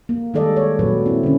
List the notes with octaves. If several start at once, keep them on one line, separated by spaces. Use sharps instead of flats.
A#3
D#3 G3 G#3 A4 D5 D#5
C#5
A#2 F#3 B4
C4 E4
D3 C#4